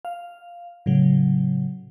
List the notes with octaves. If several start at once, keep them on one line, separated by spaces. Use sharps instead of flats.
F5
A2 C#3 F#3